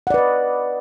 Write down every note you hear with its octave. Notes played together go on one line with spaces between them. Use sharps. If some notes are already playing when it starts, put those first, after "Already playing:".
B4 D5 D#5 F#5